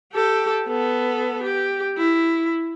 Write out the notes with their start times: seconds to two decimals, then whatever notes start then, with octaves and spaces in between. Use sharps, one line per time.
0.13 G4 A4
0.68 B3 A4
1.43 G4
1.97 E4